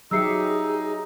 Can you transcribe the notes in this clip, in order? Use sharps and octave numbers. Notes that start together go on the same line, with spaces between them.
F#3 D#4 G4 G#4 E5 E6 C7 C#7